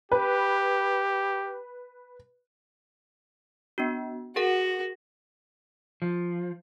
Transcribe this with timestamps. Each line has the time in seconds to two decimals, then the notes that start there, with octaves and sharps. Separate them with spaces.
0.12 G4 B4
3.78 B3 D4 F#4
4.36 F#4 G#4 A#4 F#5
6.02 F3